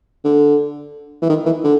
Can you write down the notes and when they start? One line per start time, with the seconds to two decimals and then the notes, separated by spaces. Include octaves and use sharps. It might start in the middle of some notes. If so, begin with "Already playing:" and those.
0.24 D3
1.22 E3
1.29 D#3
1.46 E3
1.64 D3